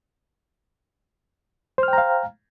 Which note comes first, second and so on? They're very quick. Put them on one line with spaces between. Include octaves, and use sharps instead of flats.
C5 F6 G5 A#5 F5